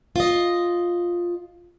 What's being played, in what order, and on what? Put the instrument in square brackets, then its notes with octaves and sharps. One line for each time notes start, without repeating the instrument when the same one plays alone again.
[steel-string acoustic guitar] F4 D#5